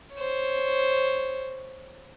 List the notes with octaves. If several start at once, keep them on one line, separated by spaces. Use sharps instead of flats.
C5 C#5